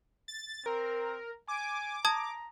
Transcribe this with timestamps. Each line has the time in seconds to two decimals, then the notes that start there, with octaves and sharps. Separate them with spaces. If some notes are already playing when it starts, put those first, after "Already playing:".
0.28 A6
0.66 C4 A#4
1.48 G#5 D6
2.05 A5 A#5 D#6 G#6